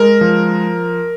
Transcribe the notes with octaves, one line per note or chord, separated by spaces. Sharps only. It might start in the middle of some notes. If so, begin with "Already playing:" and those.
Already playing: G#3 A#4
F3